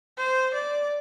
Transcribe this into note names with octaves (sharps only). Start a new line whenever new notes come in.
C5
D5